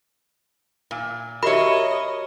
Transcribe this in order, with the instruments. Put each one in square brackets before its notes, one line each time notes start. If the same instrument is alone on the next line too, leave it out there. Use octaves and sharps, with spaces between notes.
[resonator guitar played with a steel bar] A#2
[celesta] F#4 G4 E5 [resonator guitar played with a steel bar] A#4 C#5 [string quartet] D#5 [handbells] B5